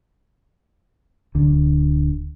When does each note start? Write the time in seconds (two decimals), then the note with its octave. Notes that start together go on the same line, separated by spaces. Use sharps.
1.35 D1 D2 D3